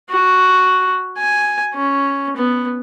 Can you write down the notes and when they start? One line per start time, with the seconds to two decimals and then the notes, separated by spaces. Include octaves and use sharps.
0.10 F#4
1.18 G#5
1.75 C#4
2.37 B3